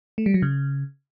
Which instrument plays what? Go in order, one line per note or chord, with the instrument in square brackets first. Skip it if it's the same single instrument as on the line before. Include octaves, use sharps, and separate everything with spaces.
[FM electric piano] A3
G3
F#3
C#3